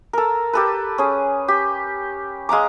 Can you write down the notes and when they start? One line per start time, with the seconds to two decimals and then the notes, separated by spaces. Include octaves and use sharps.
0.13 A4 A#4
0.53 G4 A4 B4
0.98 C#4 G#4
1.48 G4
2.49 G#3 F5 A#5 D6